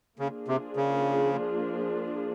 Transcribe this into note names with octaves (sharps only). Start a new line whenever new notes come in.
C#3 F3 A#3 D4 F4 G#4
C3
C#3